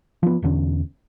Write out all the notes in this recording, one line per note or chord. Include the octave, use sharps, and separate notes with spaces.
F3 B3
E1 E2 D3 C#4